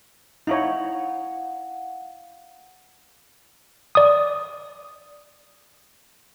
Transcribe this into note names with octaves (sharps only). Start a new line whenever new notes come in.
D#4 E4 C#5 F5 F#5
D5 D#6